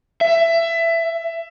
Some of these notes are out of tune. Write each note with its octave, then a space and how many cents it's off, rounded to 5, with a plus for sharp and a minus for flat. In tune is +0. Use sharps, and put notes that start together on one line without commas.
E5 +20